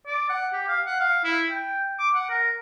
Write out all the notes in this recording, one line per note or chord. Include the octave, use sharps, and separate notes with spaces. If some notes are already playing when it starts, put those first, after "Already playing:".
D5
F#5
G4
F5
F#5
F5
E4
G5
D6
F#5
A#4